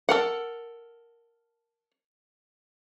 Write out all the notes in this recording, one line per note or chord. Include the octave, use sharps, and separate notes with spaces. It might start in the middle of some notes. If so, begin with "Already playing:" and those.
A4 A#4 F#5